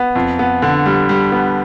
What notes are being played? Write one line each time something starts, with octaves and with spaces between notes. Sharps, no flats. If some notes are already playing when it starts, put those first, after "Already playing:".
Already playing: B3
F2
B3
D3
G3
G3
B3